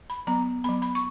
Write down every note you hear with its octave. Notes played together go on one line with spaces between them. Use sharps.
B5
F#3 B3 A#5
F#3 B3 B5
B5
C#6